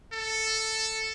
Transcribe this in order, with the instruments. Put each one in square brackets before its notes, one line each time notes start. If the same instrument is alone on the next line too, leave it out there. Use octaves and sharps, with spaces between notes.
[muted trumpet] A4